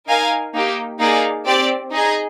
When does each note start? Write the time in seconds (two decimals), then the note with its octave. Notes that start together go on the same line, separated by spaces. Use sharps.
0.08 D#4 A#4 F5 G#5
0.54 A#3 D#4 G4
1.00 A#3 D#4 G#4 D5 F5
1.46 C4 G4 D5
1.92 D#4 G#4 D#5 G#5